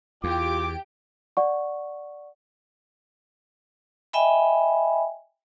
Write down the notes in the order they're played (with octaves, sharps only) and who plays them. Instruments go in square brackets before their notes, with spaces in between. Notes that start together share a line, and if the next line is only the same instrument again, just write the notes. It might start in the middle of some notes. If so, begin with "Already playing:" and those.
[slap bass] E2 [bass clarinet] F4 [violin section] G4 D7 [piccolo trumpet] D6
[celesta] D5 F#5 C#6
[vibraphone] D#5 E5 G5 G#5 B5